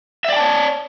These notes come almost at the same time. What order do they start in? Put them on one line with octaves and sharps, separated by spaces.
E5 D5 G5 A5 C#5